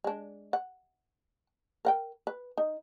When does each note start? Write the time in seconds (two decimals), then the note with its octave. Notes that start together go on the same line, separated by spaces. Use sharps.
0.04 G#3 D4
0.53 F#5
1.85 A#4 F#5 G5
2.27 B4
2.58 D#4